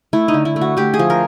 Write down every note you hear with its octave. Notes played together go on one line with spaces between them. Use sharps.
A3 E4
D#4
D3
E4
A3
F#4
A3 G4
G#4
F3
A#4